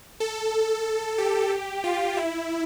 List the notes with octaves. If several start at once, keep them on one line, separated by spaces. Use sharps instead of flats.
A4
G4
F4
E4